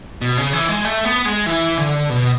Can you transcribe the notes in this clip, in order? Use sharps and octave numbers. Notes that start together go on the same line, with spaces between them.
B2
C#3
E3
G#3
A3
B3
G#3
E3
D3
B2